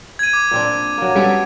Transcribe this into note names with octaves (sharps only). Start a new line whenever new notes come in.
G#6 D#7
D6
A#2 C4 D4
F#3 A#3
G3 A3 B3 C#4 G4 A4